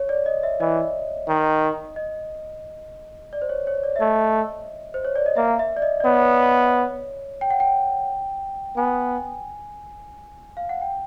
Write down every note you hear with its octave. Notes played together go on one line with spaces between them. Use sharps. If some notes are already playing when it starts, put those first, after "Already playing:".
Already playing: C#5
D5
D#5
E5
E3 D#5
D#3
D#5
D5
C5
C#5
C#5
D5
E5
A3 D#5
C5
C#5
D5
D#5
A#3 E5
E5
D5
D#5
D5
B3 C#5
G5
F#5
G5
B3 G#5
F5
F#5
G5